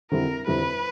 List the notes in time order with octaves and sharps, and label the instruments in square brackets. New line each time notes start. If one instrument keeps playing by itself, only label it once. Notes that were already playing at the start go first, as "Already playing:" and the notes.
[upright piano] F2 D3 G3 C4 E4 [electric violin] A#4
[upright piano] F2 D3 G3 C4 E4 [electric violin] B4